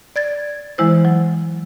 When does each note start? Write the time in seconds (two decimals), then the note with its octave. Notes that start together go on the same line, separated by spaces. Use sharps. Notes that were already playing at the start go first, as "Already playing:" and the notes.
0.16 D5 G#6 A6
0.78 E3 G#3 E4 C5
1.05 F#3